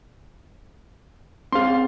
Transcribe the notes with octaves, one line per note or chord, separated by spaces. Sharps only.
C4 C#4 G#4 F5 C6